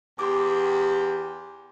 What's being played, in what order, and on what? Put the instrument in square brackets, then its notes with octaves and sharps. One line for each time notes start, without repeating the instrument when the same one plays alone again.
[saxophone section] E2 G4 [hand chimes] C6 D6